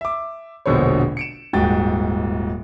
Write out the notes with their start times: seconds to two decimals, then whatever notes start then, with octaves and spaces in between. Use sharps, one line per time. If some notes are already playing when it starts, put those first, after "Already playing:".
0.01 E5 D6
0.66 E1 A#1 B2 D3 C5 C#5
1.17 C#7 D7 E7
1.53 D#1 G#2 F#4 G5 A6